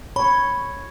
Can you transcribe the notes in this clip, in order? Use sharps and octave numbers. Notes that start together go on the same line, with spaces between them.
C#5 B5